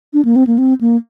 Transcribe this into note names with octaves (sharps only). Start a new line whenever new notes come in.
D4
A#3
C4
A#3
C4
A#3